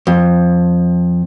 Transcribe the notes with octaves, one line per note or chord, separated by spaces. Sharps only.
F2